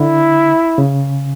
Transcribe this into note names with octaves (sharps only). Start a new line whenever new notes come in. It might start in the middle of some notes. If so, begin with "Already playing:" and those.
Already playing: D3 E4
C#3